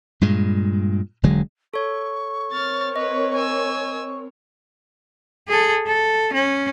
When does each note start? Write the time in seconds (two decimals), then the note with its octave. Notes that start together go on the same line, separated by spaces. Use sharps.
0.21 G2 A#2 G#3
1.23 E1 D3 F#3 G#3
1.74 A4 C#5 C#6
2.52 C4 A#4 C#5 F6 A6
2.96 B4 D#5
3.36 G#5 E6
5.48 G#4 A4
5.86 A4
6.33 C#4